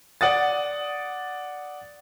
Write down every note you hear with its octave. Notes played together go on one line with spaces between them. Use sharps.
D5 F#5 D#6 A6